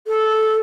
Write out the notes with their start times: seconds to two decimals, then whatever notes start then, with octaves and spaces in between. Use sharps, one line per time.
0.07 A4